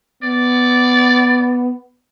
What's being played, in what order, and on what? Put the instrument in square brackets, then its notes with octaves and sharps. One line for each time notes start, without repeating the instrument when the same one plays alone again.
[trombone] B3 [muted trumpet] D5